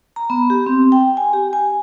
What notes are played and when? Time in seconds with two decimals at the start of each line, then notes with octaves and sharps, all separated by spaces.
0.16 A#5
0.30 B3
0.50 G4
0.66 C4
0.92 G5
1.17 G#5
1.33 G4
1.53 G#5